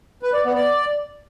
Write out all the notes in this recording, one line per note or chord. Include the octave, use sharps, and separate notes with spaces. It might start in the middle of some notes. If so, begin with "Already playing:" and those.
B4
D5
B3
D5